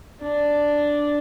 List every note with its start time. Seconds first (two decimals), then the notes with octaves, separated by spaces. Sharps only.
0.21 D4